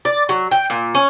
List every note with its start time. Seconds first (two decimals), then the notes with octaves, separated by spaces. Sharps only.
0.05 D5
0.29 F#3
0.51 G5
0.70 A#2
0.95 C#4